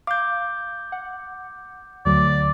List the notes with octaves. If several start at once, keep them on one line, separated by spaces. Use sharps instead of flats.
F5 D6 G6
F#5
D2 D3 F#3 D5